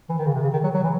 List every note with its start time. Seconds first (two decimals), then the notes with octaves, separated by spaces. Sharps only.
0.09 E3
0.18 D#3
0.26 C#3
0.34 C3
0.42 C#3
0.53 D#3
0.64 F#3
0.74 F#3
0.83 E3